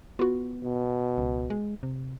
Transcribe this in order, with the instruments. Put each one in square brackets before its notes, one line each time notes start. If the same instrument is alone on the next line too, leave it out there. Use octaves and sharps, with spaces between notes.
[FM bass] B3 [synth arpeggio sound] F4 F#4
[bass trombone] B2
[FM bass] C#2
G#3
C3